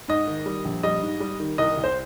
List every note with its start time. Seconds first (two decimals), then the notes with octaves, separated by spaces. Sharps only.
0.08 G#2 D#5
0.27 D#3
0.46 G3
0.65 A#1
0.83 G3 D#5
1.02 G#2
1.20 G3
1.40 D#3
1.58 C2 D#5
1.77 C2
1.84 C5